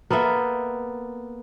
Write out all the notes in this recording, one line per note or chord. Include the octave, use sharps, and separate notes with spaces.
A#3 B3 A4 E5